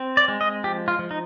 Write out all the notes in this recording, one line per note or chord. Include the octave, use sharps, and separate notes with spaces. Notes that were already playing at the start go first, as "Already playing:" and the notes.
Already playing: C4
D5
G#3
D#5
F3 G4
F4
F3
D#4